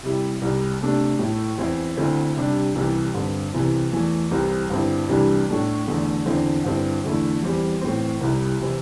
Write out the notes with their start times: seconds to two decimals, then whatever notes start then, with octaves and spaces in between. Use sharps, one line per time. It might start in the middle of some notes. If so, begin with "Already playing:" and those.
0.03 C3 G3 E4
0.42 C2 C3 G3
0.81 C3 A3 D4
1.19 A2 A3 E4
1.58 E2 E3 C4 E4
1.97 D2 D3 C4 E4
2.36 C3 G3 D4
2.75 C2 C3 E3 G3
3.14 G2 D3 C4
3.53 C2 C3 E3 C4 E4
3.92 E2 E3 A3
4.31 C2 C3 E3 G3 C4
4.70 G2 D3 C4 E4
5.09 C2 C3 E3 G3 D4
5.48 A2 A3 D4
5.87 E2 D3 A3
6.26 E2 D3 C4 E4
6.64 G2 D3 C4 E4
7.04 E2 D3 A3 E4
7.42 E2 E3 G3 C4
7.81 A2 E3 C4
8.21 C2 C3 G3 C4 E4
8.61 C3 E3 C4 E4